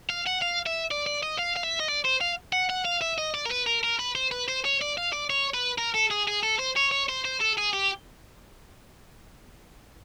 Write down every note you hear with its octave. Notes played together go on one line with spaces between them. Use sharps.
F5
F#5
F5
E5
D5
D5
D#5
F5
F5
E5
D#5
D5
C5
F5
F#5
F#5
F5
E5
D#5
D5
A#4
B4
A#4
A#4
B4
C5
B4
C5
C#5
D5
F5
D5
C#5
B4
A#4
A4
G#4
G#4
A4
C5
C#5
C#5
C5
C5
A4
G#4
G4